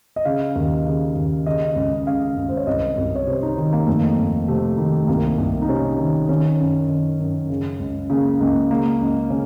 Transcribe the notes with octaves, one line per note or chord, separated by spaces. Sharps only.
D#5
C#3 F5
D#2
C#3
D#2
C#3 D#5
C#2
C#3 F5
C#2
C5
C#5
C2 D#5
C2
C#5
C3 C5
D#4
D#3
A#3
F2 A3
A#3
F2
C3 A3
D#3
A3
C2 A#3
C2
D#4
C3 C#4
D#3
D#3 C#4
F#2
D#3
F#2
C#3
C#2
C#3 A#3
C#2 A#3
C#3 A#3
C#2
C#3 C#4